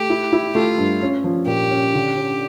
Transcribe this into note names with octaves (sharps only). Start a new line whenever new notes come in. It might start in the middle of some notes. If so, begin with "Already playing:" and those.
Already playing: A3 G4
E4
E4
A3 F4
G2
C#4
F3
A#2 G4
C#4
D3
C#4